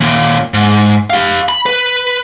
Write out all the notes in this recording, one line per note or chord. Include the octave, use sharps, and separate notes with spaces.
D#2 A#2
G#2
G4 F5
B5
B4